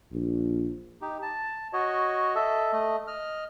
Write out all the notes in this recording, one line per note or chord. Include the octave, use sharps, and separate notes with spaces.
A#1
D#4 G4
A5
F#4 C#5 D#5
A4 D#5 E5
A3 D#5
D#5 F6